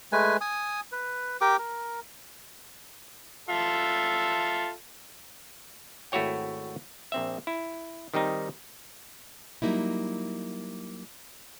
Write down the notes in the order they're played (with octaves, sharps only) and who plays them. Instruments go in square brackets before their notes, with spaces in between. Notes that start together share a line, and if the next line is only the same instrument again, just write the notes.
[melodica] G#3 A3 B4 G#5
G#5 D#6
B4
G4 A#4 G5 D6
A#4
[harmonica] F4 A4 E5
[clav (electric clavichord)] G#1 A3 E4 F#4 C#5 G5
A#1 C4 E5
E4
D#3 G3 C4 D#4
[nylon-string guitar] F#3 G3 A#3 D#4 E4